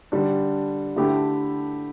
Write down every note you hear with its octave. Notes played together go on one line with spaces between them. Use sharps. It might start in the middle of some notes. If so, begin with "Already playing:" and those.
D3 G3 D4
D3 A3 E4 G4